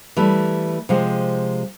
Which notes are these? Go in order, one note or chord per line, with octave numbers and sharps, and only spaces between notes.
E3 G3 A3
C3 F3 G#3